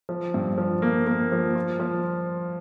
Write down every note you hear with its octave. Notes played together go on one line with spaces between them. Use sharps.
F3
G2
F3
A#3
A#3
F3
F4
F3